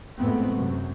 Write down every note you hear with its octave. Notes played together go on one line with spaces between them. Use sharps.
F2 A2 G#3 A3 B3 C4
F#2 C3